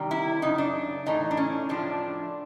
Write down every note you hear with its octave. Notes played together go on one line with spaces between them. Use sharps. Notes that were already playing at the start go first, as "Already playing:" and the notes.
Already playing: C3 D#3 G3
E4
F#2 C#3 D#4
D4
A2 E3 A3 D#4
D4
C#4
A2 F3 A3 D4